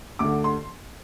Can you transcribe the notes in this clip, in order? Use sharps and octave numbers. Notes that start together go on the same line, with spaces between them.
D2 D3 D6
C6